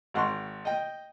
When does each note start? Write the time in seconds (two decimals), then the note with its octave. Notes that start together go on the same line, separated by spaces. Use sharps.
0.14 G#1 F#5 C6 C#6
0.65 D#5 G5